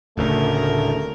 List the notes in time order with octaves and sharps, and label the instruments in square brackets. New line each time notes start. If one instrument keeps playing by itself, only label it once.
[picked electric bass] D1 D2 C#3 [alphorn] A3 [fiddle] A#4